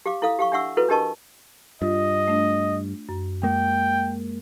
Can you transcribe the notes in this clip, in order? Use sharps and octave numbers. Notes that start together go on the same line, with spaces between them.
G4 F5 D6
E4 A4 F5 D#6
G4 F5 C#6
D4 G4 E5 F#5 C#6 E6
E4 F#4 A4 B4
D4 G4 A#4 D#5 A5 C#6
G2 F4 D#5
A3 D4
F#2
G#3 A#3 G5